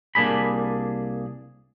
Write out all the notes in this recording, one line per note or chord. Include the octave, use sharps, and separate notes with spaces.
C2 A#3 D4 G#4 B5